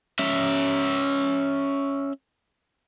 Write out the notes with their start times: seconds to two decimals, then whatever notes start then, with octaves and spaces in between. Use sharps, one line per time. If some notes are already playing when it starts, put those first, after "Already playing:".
0.19 C#4 E5